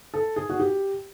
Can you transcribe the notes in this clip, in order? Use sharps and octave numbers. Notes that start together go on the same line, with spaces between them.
A4
G#4
F#4
G4